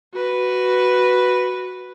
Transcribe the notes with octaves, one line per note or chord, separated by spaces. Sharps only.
F#4 B4